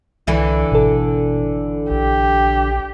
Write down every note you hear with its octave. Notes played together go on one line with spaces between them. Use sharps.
C2 D3 E3 E4
G#1 B2 A4
A#1 G4